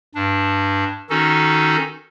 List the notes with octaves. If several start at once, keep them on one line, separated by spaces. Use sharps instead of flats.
G2 D4
D#3 C#4 D#4 F#4 A4